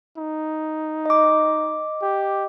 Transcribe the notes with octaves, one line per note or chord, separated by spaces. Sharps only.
D#4
D#5 D6
G4